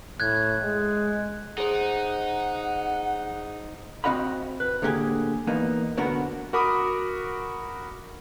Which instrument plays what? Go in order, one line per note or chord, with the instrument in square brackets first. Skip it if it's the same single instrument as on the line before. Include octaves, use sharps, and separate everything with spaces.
[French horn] A2 [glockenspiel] F#6 G#6
[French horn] G#3
[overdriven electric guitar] D#4 [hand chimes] G#4 C5 [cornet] F#5
[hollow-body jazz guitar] C4 D#4 F#4 D#5 F5 B5
B4
A2 D3 A#3 G4 G#4
E2 A#3 B3 D#4
B1 B2 D3 B3 F#4 A#4
[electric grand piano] F#4 A#4 B5 D6 D#6